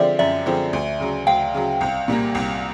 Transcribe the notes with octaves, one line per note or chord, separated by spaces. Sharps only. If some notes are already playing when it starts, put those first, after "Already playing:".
Already playing: D3 F3 G#3 C4 D5 E5
F#2 D5 E5
D3 F3 G#3 C4
D2
C#3 F#3
D2 F5 G5
C#3 F#3
C2
A#2 G3 A#3
C2